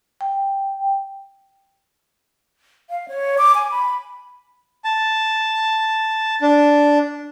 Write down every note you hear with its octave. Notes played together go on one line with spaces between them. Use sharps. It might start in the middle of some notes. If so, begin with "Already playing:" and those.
G5
F5
C#5
D6
G#5
B5
A5
D4